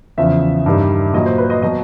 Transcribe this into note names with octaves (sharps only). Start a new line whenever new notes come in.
E2 C#3 F3 E5
G2 D#3 G3
A#2 F#3 D#5
C5
B4
D#5
B2 F#3 D#5